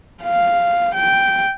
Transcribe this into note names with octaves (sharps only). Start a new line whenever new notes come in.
F5
G5